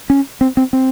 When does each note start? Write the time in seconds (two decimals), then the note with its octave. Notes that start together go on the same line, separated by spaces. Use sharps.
0.10 C#4
0.41 C4
0.57 C4
0.73 C4